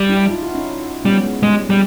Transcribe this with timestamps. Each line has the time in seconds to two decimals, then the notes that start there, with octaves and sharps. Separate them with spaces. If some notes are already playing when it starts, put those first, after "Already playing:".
Already playing: G3
0.09 D4 E4
0.29 D#4 F4
0.42 E4 F#4
0.55 C#4 D#4
1.04 G3 B3 C#4
1.23 G#3
1.43 G3 G#3
1.62 G#3
1.70 G3